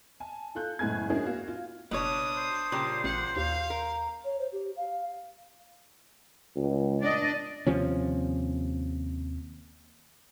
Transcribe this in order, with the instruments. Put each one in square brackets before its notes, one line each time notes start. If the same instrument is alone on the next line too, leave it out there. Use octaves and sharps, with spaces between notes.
[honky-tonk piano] G#5 A5
F4 A4 F#6 G6
F#1 A2 G#3 G#5 G#6
C#4 D4 E4 F#4 G#4 A#4
A#3 F#4 F5
F4
[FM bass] F#1 [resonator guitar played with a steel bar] B2 C#5 [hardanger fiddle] D4 D#6
[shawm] C5
[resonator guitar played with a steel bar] A#2 C#3 G3
[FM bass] A1 [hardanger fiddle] F#5
[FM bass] D#2 [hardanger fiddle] F5
[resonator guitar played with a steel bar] A#4
[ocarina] C#5
C5
G4
F5
[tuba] C#2
[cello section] D4 D5 D#5
[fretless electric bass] D#2 C3 F3 C#4